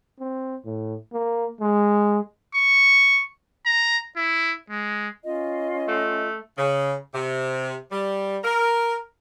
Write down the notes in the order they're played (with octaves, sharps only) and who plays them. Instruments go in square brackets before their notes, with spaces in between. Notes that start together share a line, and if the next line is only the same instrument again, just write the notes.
[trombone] C4
A2
A#3
G#3
[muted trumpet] C#6
A#5
E4
G#3
[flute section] C#4 F4 D#5
[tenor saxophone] A3
[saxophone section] C#3
C3
G3
A#4